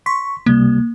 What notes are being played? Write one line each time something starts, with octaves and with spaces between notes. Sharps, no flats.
C6 C#6 B6
C#2 C3 G3 A#3